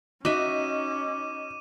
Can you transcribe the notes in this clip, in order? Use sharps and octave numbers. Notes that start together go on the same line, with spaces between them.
C#4 D#4 F#4 E5 D6 D#7